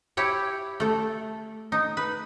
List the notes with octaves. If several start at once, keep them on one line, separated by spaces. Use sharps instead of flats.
E4 G4 C#5
A3 A4
D#4
B4